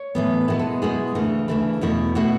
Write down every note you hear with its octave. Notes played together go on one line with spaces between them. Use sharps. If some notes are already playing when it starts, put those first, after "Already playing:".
Already playing: C#5
A2 E3 B3
B2 G#3 B3 E4 B4
A4
B2 G#3 B3 E4 G#4
D2 C#3 E3 A3
D2 C#3 E3 A3 E4
E2 B2 A3 E4
B2 A3 E4 F#4